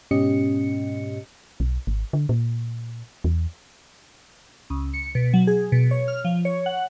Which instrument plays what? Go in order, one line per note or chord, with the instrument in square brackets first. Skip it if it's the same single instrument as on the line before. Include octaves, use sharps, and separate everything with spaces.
[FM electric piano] G#2 B2 C#4 G4 D#5 C#7
[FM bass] B1
G#1
D3
A#2
E2
[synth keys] C#2
C#7
B2
F#3
G#4
B2
C#5
F6
F3
C#5
F#5